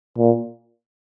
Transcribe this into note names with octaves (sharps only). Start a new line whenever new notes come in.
A#2